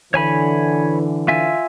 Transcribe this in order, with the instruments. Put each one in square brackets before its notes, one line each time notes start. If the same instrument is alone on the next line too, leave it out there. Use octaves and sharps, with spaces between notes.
[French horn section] D3 E3 [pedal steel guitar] C#5 G#5 B5
[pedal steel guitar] F4 E5 G#5